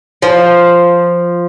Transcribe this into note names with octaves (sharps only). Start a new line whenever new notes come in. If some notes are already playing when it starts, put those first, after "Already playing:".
F3